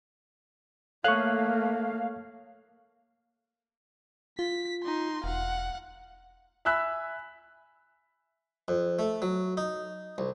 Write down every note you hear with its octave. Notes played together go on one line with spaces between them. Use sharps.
A3 A#3 A4 C#5 F5 C#6 F#6 G#6
F4 B6
D#4 C6
E1 F5 F#5
E5 G#5 B5 E6 F#6 B6
F2
A3
F#3
D#4
C2